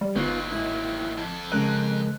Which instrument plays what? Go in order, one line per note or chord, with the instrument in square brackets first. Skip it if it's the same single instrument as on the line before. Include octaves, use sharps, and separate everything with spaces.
[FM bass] G3
[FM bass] G1 [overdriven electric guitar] D#2 F#3 [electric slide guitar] B3 D#4 F4
[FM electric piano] G#2 D#5 [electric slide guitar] E4
[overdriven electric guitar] F2 A4
[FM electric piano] C#3 F#6 [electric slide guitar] G#3 A#4 D#5